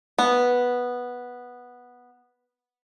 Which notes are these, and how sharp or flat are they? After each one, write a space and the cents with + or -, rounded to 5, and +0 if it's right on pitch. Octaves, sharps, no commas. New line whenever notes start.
B3 -5